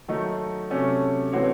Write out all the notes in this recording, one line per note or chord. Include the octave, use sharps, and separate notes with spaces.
D#3 F#3 A3 D#4
C3 F#3 A3 C#4
E3 A3 C4 F#4 C#5